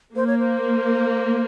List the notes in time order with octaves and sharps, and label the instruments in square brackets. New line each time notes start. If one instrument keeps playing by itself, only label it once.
[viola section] A#3 [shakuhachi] C5
[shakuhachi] C#5
C5